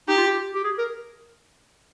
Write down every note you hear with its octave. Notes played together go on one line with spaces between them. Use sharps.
D#4 G4
F4
G4
G4
G#4
A#4